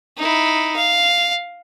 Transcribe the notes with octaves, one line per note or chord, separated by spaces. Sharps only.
D#4 E4
F5